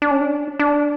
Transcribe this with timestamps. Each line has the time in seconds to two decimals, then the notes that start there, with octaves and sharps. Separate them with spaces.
0.02 D4
0.11 C#4
0.21 D4
0.59 D4